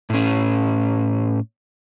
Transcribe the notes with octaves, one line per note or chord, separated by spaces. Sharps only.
A2 C#4